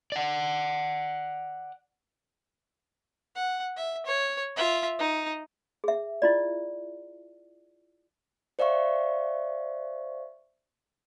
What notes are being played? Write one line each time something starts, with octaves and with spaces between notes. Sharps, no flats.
D5 F#5
F#5
E5
C#5
F4 E5
D#4
G#4 E5
E4 F4 D5
C5 D5 E5 F5 C#6